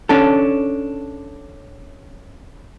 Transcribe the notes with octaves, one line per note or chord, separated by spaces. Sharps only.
C#4 D4 A4